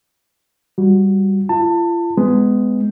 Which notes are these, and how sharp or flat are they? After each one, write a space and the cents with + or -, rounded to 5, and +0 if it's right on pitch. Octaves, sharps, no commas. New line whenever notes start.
G3 +0 F#4 -10
F4 -40 A5 +25
G#3 +0 B3 +15